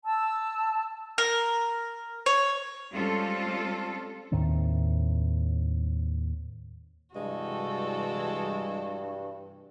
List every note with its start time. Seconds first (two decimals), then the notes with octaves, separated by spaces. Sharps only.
0.04 A5 E6
1.18 A#4
2.26 C#5
2.92 G3 G#3 C4 C#4 F4 A4
4.32 D#2 A2 D#3 C4
7.16 G2 C3 E3 G3 G#3 F#4 A4